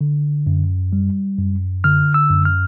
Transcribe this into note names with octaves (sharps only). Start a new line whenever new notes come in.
D3
F#2
G3
F#2
D3 F6
E6
F#2
F6